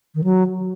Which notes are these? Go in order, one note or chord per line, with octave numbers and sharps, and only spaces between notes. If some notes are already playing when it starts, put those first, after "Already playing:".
D#3
F#3